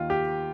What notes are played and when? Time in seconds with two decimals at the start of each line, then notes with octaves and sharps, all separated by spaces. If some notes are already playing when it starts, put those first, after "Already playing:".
Already playing: D#2 D#3 F4
0.10 G4